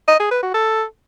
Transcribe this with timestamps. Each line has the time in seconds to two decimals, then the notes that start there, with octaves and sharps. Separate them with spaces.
0.08 D#5
0.19 G#4
0.31 B4
0.43 F#4
0.54 A4